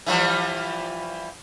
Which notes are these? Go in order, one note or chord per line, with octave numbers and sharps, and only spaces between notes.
E3 F3 G3